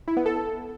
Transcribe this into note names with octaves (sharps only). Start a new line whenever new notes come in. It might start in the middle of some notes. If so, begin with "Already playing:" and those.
E4
B3
A4